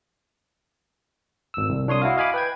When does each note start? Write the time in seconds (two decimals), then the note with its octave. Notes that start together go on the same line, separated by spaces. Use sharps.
1.54 G#1 E6
1.69 C2
1.87 C2 D4 C#5 C6 D#6
2.02 E4 F#4 F5
2.17 D#5 F5 G#5 B5 D6
2.34 B4 G5 G#6